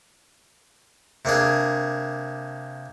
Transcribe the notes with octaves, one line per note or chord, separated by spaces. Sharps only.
C3 A#3 D4 G#4